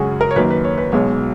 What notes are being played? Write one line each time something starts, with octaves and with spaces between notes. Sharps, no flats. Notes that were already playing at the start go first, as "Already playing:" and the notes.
Already playing: F#2 C#3 G#3 F#4 G#4
A#4
C#5
F#2 D#3 A#3 B4
B4
C#5
B4
B1 B2 G#3 C#5